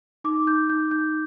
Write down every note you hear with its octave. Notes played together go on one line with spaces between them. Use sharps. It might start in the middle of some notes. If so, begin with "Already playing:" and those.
D#4 D6
D#4 G6
D#4 G6
D#4 G6